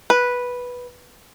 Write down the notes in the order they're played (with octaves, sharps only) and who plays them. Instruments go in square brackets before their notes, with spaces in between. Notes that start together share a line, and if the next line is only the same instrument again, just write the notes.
[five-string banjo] B4